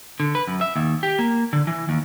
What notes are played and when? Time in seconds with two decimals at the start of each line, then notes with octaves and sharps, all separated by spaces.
0.20 D3
0.35 B4
0.48 F#2
0.61 E5
0.76 D#2
1.03 G4
1.19 A#3
1.53 D3
1.67 E3
1.89 D#2